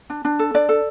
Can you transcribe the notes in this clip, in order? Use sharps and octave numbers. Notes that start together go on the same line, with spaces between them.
D4
D4
A4
D4 D5
A4